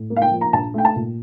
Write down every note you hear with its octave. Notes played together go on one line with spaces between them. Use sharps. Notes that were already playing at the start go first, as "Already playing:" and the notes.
Already playing: A2
A#3
F5
G5
F3
A#5
A#1 A5
A3 G5
A5
A#2